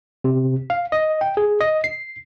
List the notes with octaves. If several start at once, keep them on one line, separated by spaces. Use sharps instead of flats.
C3
F5
D#5
G5
G#4
D#5
C7